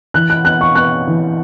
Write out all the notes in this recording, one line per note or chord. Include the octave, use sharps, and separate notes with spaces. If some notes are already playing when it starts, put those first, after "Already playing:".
E3 F#6
F#6
B3 F#6
C#6
B3 F#6
E3